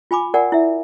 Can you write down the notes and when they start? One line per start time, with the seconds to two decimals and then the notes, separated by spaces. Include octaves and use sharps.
0.11 F4 G#5 B5 D6
0.34 A#4 D5 F#5 G#5
0.52 E4 E5